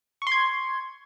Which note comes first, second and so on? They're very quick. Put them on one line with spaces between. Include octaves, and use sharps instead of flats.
C#6 C6 G#6